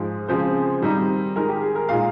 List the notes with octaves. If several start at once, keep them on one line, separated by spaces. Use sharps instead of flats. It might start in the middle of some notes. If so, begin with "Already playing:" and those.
Already playing: G#2 F3 G#3
C#3 F3 G#3 C4 C5
D#3 G3 C4 D#4
D#3 G#3 D#4 A#4
G4
G#4
A#4
A#2 G#3 D#4 F5